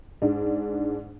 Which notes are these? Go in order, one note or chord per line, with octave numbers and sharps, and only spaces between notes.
G#2 D4